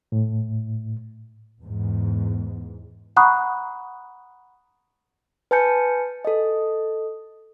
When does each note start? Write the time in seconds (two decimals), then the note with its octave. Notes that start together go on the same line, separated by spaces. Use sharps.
0.12 A2
1.62 E2 G#2
3.17 F#5 A#5 B5 C#6 D#6 F#6
5.51 B4 G#5 A5 G6 C#7
6.25 A4 D#5